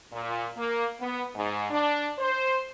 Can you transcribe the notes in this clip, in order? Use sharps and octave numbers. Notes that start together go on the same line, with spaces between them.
A#2
A#3
B3
G#2
D4
C5